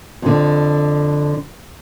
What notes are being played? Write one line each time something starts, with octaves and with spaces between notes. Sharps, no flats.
F2 D3